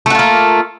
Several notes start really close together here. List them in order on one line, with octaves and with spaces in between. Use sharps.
A3 F#4 F4 A#3